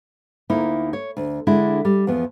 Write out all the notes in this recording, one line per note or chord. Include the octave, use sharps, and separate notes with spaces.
D2 A#3 D#4 E4
C#5
D2
D3 G#3 D4 E4
G3
E2 F3 B3